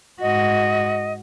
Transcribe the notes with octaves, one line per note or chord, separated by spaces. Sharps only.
G#2 F#4 D#5